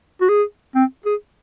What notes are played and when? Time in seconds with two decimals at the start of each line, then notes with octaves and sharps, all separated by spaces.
0.21 F#4
0.29 G#4
0.75 C4
1.05 G#4